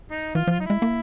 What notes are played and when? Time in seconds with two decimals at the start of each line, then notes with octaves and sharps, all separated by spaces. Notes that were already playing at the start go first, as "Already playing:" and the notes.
0.12 D#4
0.35 E3 F4
0.47 F3
0.51 F4
0.58 F#3 D#4
0.65 G#3 E4
0.82 A#3